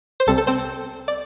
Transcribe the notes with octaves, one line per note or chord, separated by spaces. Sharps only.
C5
C2 C3 G3 C4 A4
A4
C4 C5
D5